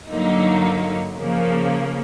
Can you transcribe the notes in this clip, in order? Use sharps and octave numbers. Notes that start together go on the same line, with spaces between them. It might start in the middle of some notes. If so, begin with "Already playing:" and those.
G2 D3 F#3 A#3 D#4
C#3 F3 A#3